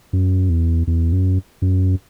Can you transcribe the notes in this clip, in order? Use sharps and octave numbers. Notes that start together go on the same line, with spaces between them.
F#2
E2
E2
F#2
F#2